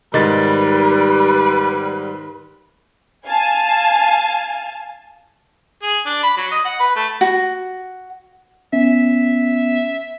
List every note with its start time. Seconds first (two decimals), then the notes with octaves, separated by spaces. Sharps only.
0.14 G#2 D#3 G3 B4 A6
3.26 F5 G#5 A5
5.83 G#4
6.06 D4
6.23 B5
6.37 F#3
6.52 D#5
6.65 F#5
6.80 B4
6.96 A3
7.21 F#4
8.73 B3 C#4 E5